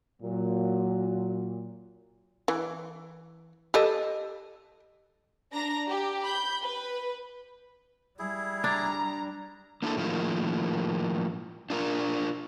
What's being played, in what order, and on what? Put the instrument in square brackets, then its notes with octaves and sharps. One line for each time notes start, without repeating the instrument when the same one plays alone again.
[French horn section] A#2 F#3
[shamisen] E3
G4 A4 D#5
[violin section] D4 A#5 A#6
G4
B5 G6
B4
[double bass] G3 [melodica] E4 G#4
[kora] D4 [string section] A#5
[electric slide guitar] A#3 D4 E4 A4
A2 D#3 F3 G#3 A#3
D4 F4 A#4